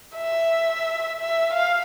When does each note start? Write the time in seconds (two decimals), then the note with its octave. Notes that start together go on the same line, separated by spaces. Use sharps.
0.17 E5
1.19 E5
1.54 F5